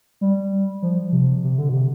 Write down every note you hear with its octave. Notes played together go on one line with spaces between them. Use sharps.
G3
F3
C3
C3
D3
B2
C3